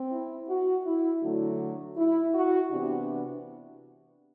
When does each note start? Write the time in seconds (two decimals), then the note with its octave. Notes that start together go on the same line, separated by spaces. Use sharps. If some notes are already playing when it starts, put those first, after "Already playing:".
Already playing: C4
0.11 E4
0.48 F#4
0.85 E4
1.21 D3 F#3 A3 D4 F#4
1.96 E4
2.33 F#4
2.70 C3 E3 B3 D4 G4